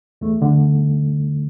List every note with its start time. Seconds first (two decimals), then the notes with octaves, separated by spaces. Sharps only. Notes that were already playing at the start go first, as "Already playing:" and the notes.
0.21 E2 A3
0.42 D3